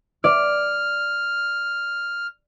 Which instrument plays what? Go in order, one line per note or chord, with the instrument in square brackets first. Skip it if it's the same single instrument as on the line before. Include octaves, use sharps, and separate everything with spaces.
[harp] D5 [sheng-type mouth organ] F6